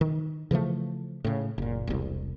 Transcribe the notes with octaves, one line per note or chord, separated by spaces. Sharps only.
D#3
C#3 E3 F3 A3
A2 C#3
F#1 A#2
E1 C2